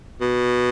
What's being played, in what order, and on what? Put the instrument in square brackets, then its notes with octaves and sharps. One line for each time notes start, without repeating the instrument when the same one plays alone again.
[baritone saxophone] B2